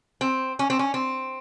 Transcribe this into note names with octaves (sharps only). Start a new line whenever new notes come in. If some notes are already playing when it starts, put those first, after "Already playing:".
C4
C#4
C4
C#4
C4